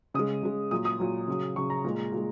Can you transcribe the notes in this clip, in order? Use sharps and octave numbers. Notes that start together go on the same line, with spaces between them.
C#3 G#3 D#6
C#3 G#3
A#2 F#3 D#6
D#6
A#2 F#3
C#3 F#3
C#3 F#3 C#6
A#5
A#2 G#3
A#2 G#3